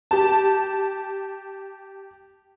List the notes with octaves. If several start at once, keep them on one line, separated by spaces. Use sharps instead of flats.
G4 A5